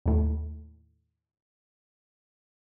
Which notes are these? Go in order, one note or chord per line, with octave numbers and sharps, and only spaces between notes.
D#2 A2